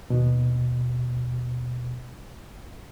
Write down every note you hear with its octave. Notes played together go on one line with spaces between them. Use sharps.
D#2 B2